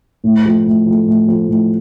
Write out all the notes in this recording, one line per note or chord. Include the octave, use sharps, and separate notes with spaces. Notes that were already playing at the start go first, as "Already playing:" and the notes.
A2
F3 A3
A2
F3 A3
A2
F3 A3
A2